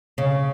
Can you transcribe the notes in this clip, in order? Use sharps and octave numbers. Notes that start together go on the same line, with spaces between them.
C#3